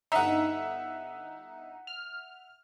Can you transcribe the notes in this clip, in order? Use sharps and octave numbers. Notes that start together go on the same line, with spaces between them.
G1 D#4 E5 F#5
F6